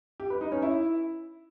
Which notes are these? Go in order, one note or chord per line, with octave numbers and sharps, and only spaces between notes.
G4
B4
D#4
C#4
E4